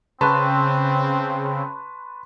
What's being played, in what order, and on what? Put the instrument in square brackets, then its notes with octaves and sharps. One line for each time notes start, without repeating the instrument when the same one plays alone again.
[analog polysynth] C#3 [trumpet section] C4 [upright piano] B4 A5 [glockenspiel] C6 C#6 F#6